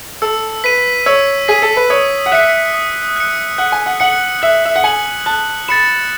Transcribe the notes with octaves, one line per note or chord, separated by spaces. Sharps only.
A4 E6
B4 B6 D#7
C#5 E6
G#4 B6 D#7
A4
B4
C#5 D#6
F#5
E5 F#6 C#7
D#6
F#6 C#7
F#5 F#6
G#5
F#5
F#5 C#7 F#7
E5 F#6
E5
F#5
G#5 C#7 F#7
A5 F#6
B5 A6 C#7 E7